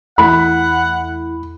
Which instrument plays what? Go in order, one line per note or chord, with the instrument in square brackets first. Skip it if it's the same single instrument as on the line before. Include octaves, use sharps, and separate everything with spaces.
[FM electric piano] E2 A3 E4 [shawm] F#5 [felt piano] B5